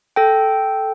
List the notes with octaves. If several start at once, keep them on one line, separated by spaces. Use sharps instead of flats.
A4 G5